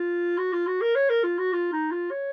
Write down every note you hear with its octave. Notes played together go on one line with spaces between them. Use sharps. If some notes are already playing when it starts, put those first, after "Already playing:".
Already playing: F4
F#4
F4
F#4
A#4
C#5
A#4
F4
F#4
F4
D#4
F4
C#5